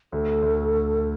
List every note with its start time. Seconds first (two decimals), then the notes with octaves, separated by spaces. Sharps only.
0.12 D2 A4
0.42 D2